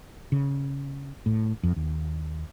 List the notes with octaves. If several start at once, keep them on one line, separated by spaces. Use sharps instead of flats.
C#3
A2
F2
D#2